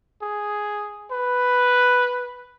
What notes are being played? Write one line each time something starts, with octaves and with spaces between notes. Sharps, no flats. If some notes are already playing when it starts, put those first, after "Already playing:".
G#4
B4